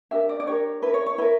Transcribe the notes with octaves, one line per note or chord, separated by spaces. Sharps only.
D4 G4 A#4 E5
D5
D5
D4 G4 A#4 C#5
E4 A#4 B4
C#5
C#5
E4 A#4 B4